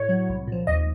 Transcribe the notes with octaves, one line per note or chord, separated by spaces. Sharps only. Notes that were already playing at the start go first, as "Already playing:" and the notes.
Already playing: A2 C#5
F#3
C2
A#2 F3
D#2 D#5